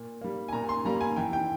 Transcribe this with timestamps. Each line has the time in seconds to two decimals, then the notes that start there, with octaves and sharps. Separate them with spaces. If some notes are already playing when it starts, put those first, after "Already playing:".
Already playing: A#2
0.21 G3 A#3
0.48 G#5
0.53 A#2 A#5
0.69 C6
0.85 G3 A#3 A#5
1.01 G#5
1.16 E3 G5
1.33 G5